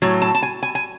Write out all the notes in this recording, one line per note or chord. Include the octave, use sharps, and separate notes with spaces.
A2 F#3
A5
A5
G#5
G#5
G#5